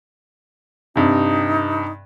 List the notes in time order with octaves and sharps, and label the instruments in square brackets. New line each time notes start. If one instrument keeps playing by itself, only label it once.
[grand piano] G2 C3 [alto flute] D#4